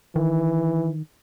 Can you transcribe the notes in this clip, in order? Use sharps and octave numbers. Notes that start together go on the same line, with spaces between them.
D#3 E3